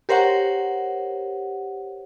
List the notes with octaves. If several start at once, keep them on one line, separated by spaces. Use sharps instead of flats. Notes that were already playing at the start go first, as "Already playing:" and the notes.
G4 A#4 C5 C#5 F#5